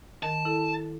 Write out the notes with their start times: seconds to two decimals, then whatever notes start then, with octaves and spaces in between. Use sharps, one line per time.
0.23 D#3 A#4 A5
0.45 E4 A4